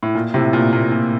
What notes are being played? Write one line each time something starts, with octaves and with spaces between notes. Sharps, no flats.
A2
A#2
A2 C3
A#2
A#2
A#2